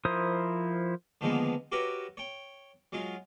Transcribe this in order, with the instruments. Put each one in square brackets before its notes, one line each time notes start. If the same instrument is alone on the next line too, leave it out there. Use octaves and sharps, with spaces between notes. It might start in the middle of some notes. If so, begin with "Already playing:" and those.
[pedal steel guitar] F3 E4 A#4 C5 D#6
[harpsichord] D3 D#3 F3 G#3 A#3 B3
F#4 G4 A#4 B4 C#5 E5
C#5 G5
F#3 G#3 F4